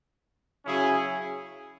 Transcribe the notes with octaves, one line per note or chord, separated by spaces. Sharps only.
C#3 F#3 C#4 E4 G#4